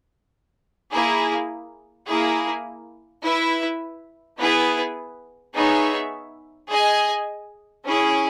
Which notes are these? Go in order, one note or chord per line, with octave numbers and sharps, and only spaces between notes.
A#3 E4 G#4
A#3 E4 G#4
E4 B4 E5
B3 E4 G#4 B4
B3 D#4 G#4 C#5 E5
G#4 D#5 G#5
C#4 E4 G#4